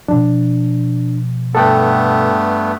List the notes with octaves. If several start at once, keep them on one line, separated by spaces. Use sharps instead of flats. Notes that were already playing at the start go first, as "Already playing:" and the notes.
B2 F3 D4
G2 A3 B3 A4 F#5 G5